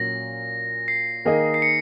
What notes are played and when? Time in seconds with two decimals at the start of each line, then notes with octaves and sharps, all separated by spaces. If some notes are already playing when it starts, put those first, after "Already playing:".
Already playing: A#2 F#3 C#4 A#6
0.88 C7
1.25 D#3 A#3 D#4 G#4 D#5
1.54 C7
1.62 C#7